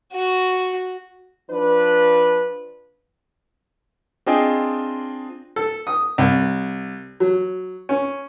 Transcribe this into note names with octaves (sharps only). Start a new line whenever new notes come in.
F#4
F3 D4 B4
C4 D4 F4 G#4 D#5 G5
A4
D#6
C2
F#3
C#4